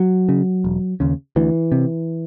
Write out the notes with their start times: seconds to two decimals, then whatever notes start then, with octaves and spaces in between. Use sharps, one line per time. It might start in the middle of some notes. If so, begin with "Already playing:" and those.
Already playing: F#3
0.29 C#3
0.64 E1
1.00 D#2 C#3
1.36 D2 E3
1.72 C3